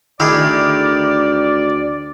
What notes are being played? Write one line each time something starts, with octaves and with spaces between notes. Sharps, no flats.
D2 D#3 E4 G#4 D5